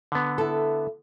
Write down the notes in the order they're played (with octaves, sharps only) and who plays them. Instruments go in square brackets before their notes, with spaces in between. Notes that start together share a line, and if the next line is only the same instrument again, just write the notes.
[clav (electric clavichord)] D3 B3
[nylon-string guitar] E4 A4